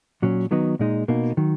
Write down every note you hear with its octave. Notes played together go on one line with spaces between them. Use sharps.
A#2 F#3 C#4
D#3 F#3 B3 D#4
A#2 G#3 D#4
B2 A#3 D#4
D#3 F#3